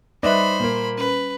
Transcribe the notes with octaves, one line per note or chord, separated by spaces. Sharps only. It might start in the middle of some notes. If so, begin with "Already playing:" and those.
G3 D#4 B4 C5 D5 E5 B5 F#6
A#2 A#3
C#4 B4